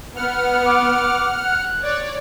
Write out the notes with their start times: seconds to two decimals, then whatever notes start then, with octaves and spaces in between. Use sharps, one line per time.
0.16 B3 F#5 F6
0.66 D6
1.44 F#6
1.82 C#5 D5